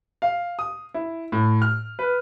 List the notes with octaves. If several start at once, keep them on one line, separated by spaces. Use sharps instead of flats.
F5
D#6
E4
A2
F6
B4